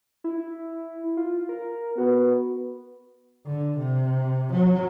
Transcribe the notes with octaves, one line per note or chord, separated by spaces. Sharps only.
E4
F4
A#4
B3 F#4
D3
C3
F#3